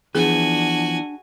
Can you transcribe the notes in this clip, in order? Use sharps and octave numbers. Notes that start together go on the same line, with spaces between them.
E3 F3 B3 D4 F#4 G#4 G#5